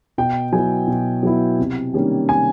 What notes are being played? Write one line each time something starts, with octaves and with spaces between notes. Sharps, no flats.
B2 G5
F#3 B3 E4 G#5
B2
F#3 B3 E4
C3
D#3 G3 A#3 C#4
C3 G#5